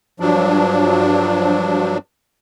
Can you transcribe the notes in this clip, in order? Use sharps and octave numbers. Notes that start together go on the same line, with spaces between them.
G2 F3 F#3 D4